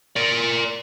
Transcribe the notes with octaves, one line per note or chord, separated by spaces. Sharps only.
A#4 D5